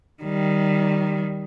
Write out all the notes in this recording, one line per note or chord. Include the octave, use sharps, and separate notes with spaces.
D#3 G3